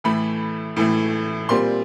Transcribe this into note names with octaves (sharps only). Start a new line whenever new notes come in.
A2 E3 A3 B5
A2 E3 A3
A#2 G3 C4 C6